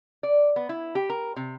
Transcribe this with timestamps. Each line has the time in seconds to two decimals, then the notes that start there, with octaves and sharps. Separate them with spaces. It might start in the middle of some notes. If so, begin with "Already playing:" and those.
0.23 D5
0.56 B3
0.69 E4
0.95 G4
1.10 A#4
1.36 C3